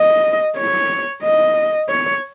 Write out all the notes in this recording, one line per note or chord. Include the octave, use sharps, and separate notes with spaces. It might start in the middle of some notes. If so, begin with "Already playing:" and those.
Already playing: D#5
C#5
D#5
C#5